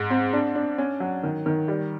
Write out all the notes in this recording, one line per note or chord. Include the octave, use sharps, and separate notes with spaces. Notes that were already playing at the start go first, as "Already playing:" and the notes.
Already playing: G#2
C4
D4
D4
C#4
F#3
D#3
D#3
G3